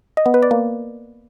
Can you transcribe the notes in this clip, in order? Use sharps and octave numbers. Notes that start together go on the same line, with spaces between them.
D#5
B3
B4
D5
A#3